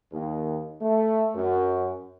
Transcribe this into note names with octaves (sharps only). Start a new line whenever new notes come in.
D#2
A3
F#2